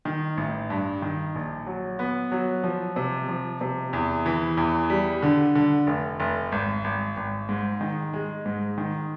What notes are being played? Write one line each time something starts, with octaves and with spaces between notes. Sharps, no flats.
D#3
A1
G2
D#3
A#1
F#3
B3
F#3
F3
C3
F3
C3
E2
E3
E2
G3
D3
D3
F1
F1
G#1
G#1
G#1
G#2
D#3
G#3
G#2
D#3